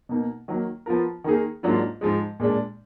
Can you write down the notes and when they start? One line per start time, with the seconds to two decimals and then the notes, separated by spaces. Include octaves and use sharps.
0.09 B2 A#3 D#4
0.48 D#3 F#3 A#3
0.86 F3 B3 F4 A#4
1.24 D#3 A#3 D#4 G#4
1.63 G#2 F#3 A#3 D4 F4
2.01 G#2 F3 G#3
2.40 A#2 G#3 D4